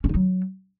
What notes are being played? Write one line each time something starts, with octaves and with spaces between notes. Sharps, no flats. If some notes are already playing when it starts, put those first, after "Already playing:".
C#4
D#4
F#3